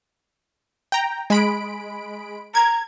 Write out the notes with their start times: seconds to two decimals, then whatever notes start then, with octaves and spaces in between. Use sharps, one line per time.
0.92 G5 A#5
1.30 G#3 B5 D7
2.55 A#5 G#6